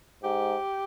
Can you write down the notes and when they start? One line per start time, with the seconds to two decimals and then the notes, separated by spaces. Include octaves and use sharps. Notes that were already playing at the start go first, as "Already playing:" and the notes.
0.23 G#2 G4